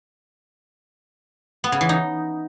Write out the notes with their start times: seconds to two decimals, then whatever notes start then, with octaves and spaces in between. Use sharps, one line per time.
1.64 B3
1.72 C#3
1.81 E3
1.89 D#4